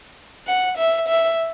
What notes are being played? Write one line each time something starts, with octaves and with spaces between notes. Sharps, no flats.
F#5
E5
E5